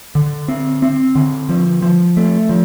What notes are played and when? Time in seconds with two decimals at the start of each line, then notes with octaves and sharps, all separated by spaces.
0.15 D3
0.48 C4
0.82 C4
1.15 D3
1.49 F3
1.82 F3
2.17 A3
2.49 F3